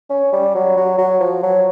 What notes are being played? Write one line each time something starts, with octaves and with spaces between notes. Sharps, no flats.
C#4
G3
F#3
F#3
F#3
F3
F#3